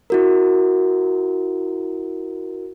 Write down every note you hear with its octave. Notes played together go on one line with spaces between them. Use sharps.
E4 F#4 A#4